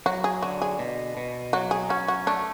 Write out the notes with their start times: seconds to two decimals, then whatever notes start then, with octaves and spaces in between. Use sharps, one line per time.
0.06 F#3 F#4
0.24 G#4
0.42 D3 F#4
0.62 G#4
0.79 B2
1.17 B2
1.53 F#3 F#4
1.71 G#4
1.89 C#4 F#4
2.08 F#4
2.27 A3 D4